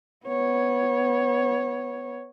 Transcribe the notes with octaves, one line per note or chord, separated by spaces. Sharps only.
B3 C#5